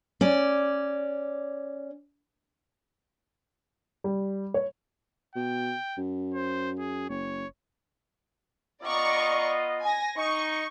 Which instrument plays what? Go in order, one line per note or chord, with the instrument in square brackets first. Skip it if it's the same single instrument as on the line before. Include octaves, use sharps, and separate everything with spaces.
[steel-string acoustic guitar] C#4 D5
[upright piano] G3
C#5
[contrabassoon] B2 [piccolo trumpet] G5
[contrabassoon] F#2
[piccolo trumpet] C5
G#4
[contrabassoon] F#1 [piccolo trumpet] C#5
[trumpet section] B3 F4 D#5 [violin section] D5 A#5 C#6
[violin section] G#5 A#6
[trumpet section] D#4 [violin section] C#6